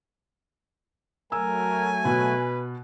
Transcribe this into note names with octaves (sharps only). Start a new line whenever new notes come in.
F#3 A3 A#4 G#5 E6
B2 B4